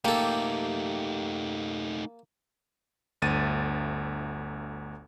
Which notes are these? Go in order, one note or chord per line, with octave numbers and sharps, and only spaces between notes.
A3 A#3 D#4 G4 A4
G1 D2 A6 D#7